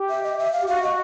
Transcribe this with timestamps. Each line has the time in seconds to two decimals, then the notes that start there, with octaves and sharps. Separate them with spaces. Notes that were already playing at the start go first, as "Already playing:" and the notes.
Already playing: G4
0.09 E5
0.23 D#5
0.38 E5
0.53 F5
0.61 G4
0.67 F#4 F5
0.83 D#5